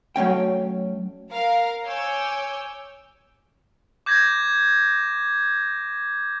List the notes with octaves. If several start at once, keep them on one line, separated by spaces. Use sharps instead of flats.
F#3 A3 C#4 G5
A#4 F5
C#5 G#5 D6 E6 G6
D6 G6 G#6 A#6